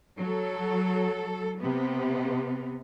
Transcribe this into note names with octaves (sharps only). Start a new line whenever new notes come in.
F#3 A4
C3 B3